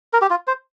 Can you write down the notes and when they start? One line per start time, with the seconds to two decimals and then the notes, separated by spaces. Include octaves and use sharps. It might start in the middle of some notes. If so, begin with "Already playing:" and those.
0.13 A#4
0.22 G4
0.30 F4
0.47 C5